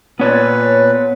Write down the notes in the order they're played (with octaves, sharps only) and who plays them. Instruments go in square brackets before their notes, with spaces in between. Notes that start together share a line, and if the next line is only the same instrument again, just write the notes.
[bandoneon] A#2 B4 [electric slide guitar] B3 C#5 D5